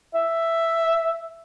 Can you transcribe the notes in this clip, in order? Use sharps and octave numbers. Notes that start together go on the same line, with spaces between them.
E5